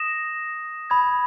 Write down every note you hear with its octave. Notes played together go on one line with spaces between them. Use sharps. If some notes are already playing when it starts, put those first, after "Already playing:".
Already playing: D#6 A#6 E7
B5 D#6 G#6